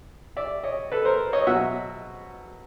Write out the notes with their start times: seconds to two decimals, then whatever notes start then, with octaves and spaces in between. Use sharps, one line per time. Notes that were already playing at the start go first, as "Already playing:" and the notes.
0.37 D5 E5
0.64 C#5 D#5
0.92 A4 B4
1.05 A#4 C5
1.33 C#5 D#5
1.47 B2 F#3 E5 F#5